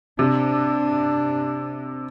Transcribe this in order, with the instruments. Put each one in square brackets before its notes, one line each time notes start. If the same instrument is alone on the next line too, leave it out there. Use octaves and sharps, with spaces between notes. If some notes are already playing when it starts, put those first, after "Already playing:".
[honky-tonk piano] C3 [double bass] D4